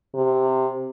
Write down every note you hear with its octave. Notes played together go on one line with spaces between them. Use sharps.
C3